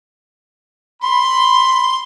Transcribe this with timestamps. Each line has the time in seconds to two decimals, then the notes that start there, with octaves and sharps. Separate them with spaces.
1.03 B5 C6